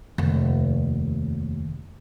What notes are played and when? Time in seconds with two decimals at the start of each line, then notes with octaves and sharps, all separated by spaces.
0.18 F1 D#2